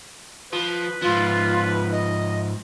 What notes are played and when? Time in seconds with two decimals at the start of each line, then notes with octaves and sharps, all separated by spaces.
0.53 F3 B4
1.02 G#2 F3 F4
1.92 D#5